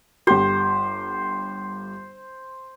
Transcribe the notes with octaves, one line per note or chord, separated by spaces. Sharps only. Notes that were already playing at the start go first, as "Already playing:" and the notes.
G1 G4 C5